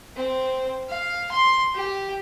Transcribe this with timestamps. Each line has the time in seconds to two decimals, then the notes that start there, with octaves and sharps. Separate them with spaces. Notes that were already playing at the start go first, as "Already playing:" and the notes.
0.17 C4
0.89 F5
1.31 C6
1.75 G4